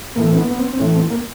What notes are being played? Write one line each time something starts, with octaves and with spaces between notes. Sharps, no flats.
A2 E3 A#3
C4
B3
B3
C4
C4
A2 E3 C#4
C4
A#3